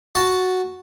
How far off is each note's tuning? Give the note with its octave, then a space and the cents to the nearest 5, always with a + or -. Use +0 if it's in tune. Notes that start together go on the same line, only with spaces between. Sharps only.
F#4 +0 A5 +0